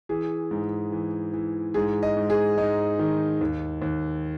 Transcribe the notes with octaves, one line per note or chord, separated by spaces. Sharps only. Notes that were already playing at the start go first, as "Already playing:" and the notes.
E3 G#4
G#2
E3
E3
G#2 G#4
D#5
G#2
G#4
G#2 D#4
D#3
D#2
D#2